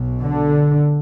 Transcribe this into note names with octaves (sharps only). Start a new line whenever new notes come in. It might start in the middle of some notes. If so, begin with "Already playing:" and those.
Already playing: B1 B2
D3